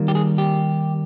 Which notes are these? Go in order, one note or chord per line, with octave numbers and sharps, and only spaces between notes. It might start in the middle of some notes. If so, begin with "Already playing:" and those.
Already playing: D#3 G3 A#3
G4
G#4
G4